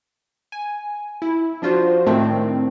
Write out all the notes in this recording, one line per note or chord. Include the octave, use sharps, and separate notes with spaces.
G#5
E4
F3 D4 F4 F#4 C5
A2 D#3 A3 C4 D4